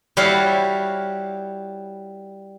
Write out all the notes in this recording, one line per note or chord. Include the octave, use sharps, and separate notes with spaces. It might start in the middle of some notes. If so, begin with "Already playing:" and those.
G3 E4 F#4 C#5 F5